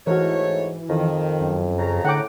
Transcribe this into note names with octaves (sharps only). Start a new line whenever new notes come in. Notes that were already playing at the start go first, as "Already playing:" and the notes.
G#2 E3 A3 F#4 A#4 C#5
F2 D#3
F#2
C#3 A#5
A2 D3 F#5 G5 D6